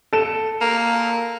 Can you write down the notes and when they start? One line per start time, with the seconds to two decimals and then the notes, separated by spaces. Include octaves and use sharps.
0.13 A4 E7
0.61 A#3